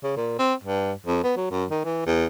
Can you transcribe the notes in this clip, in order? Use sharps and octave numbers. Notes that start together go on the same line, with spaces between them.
C#3
A#2
C4
G2
F2
B3
F#3
F#2
D#3
E3
E2